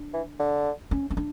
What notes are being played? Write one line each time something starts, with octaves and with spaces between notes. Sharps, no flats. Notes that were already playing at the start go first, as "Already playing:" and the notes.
Already playing: D4
E3
D3
C#4
C#4
D4